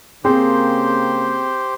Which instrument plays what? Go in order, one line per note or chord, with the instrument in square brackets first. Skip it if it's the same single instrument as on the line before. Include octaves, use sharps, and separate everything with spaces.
[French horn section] C#3 A#3 [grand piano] C4 G#4 [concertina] G4 C5